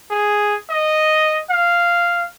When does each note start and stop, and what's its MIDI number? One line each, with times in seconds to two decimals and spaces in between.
0.11 0.55 68
0.70 1.38 75
1.50 2.25 77